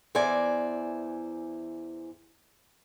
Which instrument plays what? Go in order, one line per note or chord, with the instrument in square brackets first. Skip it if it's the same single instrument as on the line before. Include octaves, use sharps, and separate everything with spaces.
[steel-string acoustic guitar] E2 E3 C5 D5 G#5